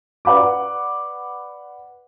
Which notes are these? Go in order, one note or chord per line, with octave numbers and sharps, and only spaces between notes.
B4 D5 F#5 B5 D6